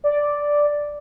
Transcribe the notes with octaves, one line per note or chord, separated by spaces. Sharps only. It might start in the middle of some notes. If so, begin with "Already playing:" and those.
D5